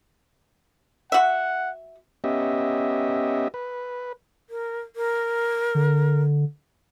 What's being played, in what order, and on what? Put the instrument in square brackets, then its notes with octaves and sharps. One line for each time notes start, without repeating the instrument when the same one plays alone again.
[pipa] F#4 E5 [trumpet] F#5
[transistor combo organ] B3 C#4 G4 D#5 E5
B4
[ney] A#4
A#4
[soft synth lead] D3